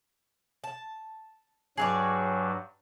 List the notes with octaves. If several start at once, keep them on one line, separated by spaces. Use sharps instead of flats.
A5
G2 F#3 G#4 C#5 D5